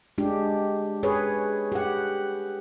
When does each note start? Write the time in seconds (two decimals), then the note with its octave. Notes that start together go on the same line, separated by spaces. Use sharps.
0.18 G#3 D4 G4
1.03 G#4 B4 C#5
1.72 G4 F#5